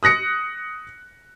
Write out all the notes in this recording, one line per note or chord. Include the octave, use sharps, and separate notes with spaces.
D#6 F#6 A#6 C#7